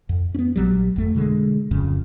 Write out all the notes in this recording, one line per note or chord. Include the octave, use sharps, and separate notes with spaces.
F2
B3 C#4
A#1 F#3 G3
G1 F2 A3
B2 D3 E3 G#3
D1 F2 C#3